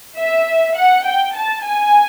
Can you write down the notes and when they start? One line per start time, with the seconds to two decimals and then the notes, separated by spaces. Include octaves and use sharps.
0.17 E5
0.76 F#5
1.06 G5
1.36 A5
1.65 G#5